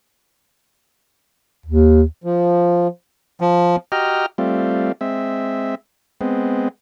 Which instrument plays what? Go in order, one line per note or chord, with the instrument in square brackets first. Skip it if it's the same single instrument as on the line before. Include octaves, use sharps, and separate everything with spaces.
[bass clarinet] D#2
[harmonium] F3
[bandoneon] F3
[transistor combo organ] F#4 G4 D#5 G5 A#5 F6
G3 A3 C4 F4
G#3 C4 E5
G#3 B3 C4